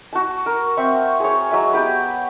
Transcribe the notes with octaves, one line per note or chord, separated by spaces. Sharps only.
F#4 A5
A#4
C4 E5 C#6
G#4 C#5
F#3 G#3 E5
B3 G4 B4